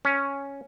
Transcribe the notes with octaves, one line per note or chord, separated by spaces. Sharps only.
C#4